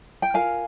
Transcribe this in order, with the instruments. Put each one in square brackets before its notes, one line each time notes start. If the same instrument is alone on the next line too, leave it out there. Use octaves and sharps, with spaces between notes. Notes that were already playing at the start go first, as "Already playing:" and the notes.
[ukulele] G5
F4 A#4 F5 G#5